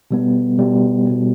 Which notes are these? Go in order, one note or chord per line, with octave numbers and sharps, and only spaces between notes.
B2 G3 B3
B2 G3 B3
B2 G3 B3